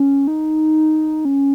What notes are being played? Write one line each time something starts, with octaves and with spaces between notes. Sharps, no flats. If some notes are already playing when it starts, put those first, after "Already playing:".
Already playing: C#4
D#4
C#4